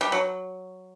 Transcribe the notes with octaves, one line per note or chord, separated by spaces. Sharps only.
G3
F#3